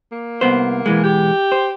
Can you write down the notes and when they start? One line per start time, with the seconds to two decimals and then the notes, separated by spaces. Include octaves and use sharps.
0.12 A#3
0.41 C2 B3 C5
0.86 B2 E3 G#3
1.03 G4
1.52 C5